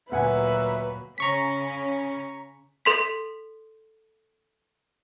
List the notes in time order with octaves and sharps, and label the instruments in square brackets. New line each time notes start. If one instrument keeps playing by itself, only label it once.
[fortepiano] D2 F#5 G#5 [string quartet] A#2 F#3 A#3 [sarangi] B4 [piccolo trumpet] E5
[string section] C#3 C#4 [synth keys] A#5 C#6 B6
[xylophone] A4 C6 B6